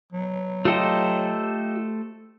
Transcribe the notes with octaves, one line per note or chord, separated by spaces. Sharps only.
F#3
A3 F4 G4 A4 C5 D#5